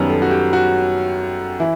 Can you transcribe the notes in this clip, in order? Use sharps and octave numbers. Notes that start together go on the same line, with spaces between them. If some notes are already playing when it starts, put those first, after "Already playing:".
Already playing: F#2 D#3 G3 B3
A4
F#4
G4
F#4
E3 E4